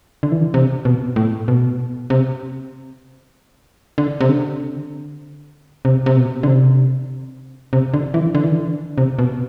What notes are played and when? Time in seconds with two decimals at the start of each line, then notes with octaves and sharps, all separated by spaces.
0.23 D3
0.32 E3
0.41 D3
0.54 C3
0.85 B2
1.16 A2
1.48 B2
2.10 C3
3.98 D3
4.21 C3
4.29 D3
5.85 C3
6.06 C3
6.17 B2
6.43 D3
6.47 C3
7.73 C3
7.94 D3
8.14 E3
8.35 D3
8.44 E3
8.52 D3
8.98 C3
9.19 B2